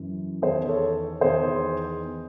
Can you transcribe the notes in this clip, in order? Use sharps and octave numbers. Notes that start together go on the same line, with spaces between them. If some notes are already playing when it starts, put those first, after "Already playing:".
Already playing: F#2 E3
E2 D#3 G#4 C5
A4 C#5
E2 D#3 G#4 C5